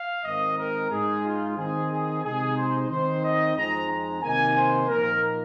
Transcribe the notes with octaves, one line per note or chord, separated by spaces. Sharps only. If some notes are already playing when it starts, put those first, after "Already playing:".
Already playing: F5
G#2 D#3 C4 D#4 D#5
A#4
G#2 G#3 D#4 G#4
F4
D#3 C4 D#4 G#4
G#4
C3 G#3 D#4 G#4
C5
D#3 C4 D#4 C5
D#5
F2 F3 G#3 C4 D#4 A#5
A#5
C3 D#3 A#3 D#4 G#5
C5
A#2 F3 A#3 D#4 A#4